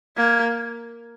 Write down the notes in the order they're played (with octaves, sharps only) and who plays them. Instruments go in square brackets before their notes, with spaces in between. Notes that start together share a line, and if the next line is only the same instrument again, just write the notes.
[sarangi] A#3 [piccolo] G#6